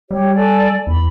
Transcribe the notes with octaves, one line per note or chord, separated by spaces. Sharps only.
G3 G4 C#5
A4 D5 G#5
E2 B5